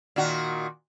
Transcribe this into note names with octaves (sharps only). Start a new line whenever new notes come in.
A#2 D#3 F#4